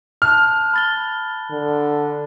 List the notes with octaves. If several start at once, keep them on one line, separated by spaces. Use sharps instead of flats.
A5 F6 F#6
B5 A6 G7
D3